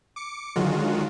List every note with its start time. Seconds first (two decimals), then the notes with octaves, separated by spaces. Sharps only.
0.16 D6 C#7
0.56 D3 D#3 F#3 G#3 F4 F#4